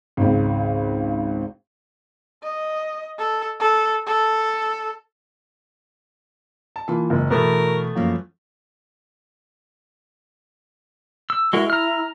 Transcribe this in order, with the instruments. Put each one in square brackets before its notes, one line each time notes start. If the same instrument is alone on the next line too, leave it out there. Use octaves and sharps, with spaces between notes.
[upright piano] G#1 C#2
[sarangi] D#5
A4
A4
A4
[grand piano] A5
[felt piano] E3 A#3 F4
[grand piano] F#1 [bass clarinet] G#3
[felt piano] B2 E3 [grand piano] A3 B3 [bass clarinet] A#4
[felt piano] F#2 F3 C#4 [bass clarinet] A#3
[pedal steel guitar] E6
[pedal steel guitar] G#3 F#4 A#4 [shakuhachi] E4
[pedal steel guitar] A#5 F6